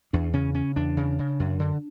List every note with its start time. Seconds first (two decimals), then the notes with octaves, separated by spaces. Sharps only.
0.13 E2 D4
0.33 C#3 C#4
0.54 C#3 C#4
0.76 E2 D4
0.97 C#3
1.19 C#3
1.40 F#2
1.60 D3